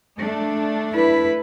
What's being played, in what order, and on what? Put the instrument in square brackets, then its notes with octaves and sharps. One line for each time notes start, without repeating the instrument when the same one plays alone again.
[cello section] A3 D4
[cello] E4 B4